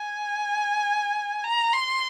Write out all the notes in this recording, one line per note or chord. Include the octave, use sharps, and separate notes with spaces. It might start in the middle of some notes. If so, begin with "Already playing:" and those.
Already playing: G#5
A#5
C6